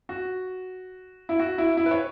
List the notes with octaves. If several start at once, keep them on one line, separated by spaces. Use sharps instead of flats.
F#4
E4
F#4
E4
E4
B4
C#5